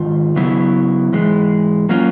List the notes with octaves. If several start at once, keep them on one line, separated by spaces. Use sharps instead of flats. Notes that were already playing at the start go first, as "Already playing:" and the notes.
Already playing: G#2 D#3 F4
C#3 F#3 B3 E4
G#2 E3 G#3
F#3 A#3 C#4 F4